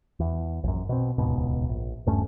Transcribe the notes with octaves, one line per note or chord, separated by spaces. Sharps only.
E2
A#1 F#2
B2 C4
D#1 C#2 G#2 B2
A#1
D#1 G2 A3 C#4